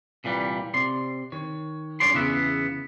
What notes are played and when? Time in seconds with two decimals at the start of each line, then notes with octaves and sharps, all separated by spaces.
0.24 C2 A#2 E3 G3
0.74 C3 D5 C6
1.32 D#3 C#5
2.00 G2 C#4 C#5 D5 C6
2.14 E2 C#3 B3 E5